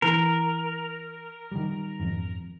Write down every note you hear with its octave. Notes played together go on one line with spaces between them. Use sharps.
E3 A#4
D#3 G3
G#1 F2